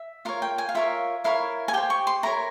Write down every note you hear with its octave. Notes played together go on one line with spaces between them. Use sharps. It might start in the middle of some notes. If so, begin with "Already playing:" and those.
Already playing: E5
F4 A#4 C#5 F5
G5
G#5
F5
F4 A#4 C#5 E5
E4 A#4 C#5 F5
G#5
G4 C5 G5
C#6
C6
E4 A#4 C#5 A#5